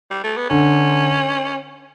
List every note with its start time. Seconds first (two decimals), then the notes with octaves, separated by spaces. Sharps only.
0.11 G3
0.24 A3
0.37 B3
0.50 D3 C#4